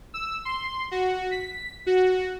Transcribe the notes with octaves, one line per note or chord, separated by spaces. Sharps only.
E6
C6
F#4
B6
F#4